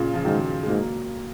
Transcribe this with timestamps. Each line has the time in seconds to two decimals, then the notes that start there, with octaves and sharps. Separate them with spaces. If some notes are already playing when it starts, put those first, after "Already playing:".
Already playing: A#2 C#3
0.14 C#3 F3
0.25 G#2 D#3 F#3
0.63 G#3
0.68 G#2 F#3 A#3